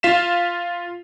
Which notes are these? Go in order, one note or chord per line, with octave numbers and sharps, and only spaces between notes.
F4 F5 B6 E7